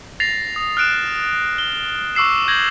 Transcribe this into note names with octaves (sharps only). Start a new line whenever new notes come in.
A6 A#6 C7 F7
D#6
F6 F#6 D7 E7
G7
C#6 D6 E6 C7 E7
G6 G#6 A#6 E7 F#7